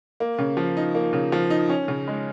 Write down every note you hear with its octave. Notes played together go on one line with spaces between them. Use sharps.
A#3
C#3
F3
D#4
A#3
C#3
F3
D#4
C#4
C#3
G#3